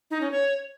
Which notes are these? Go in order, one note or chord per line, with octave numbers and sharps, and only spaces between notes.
D#4
C#4
C#5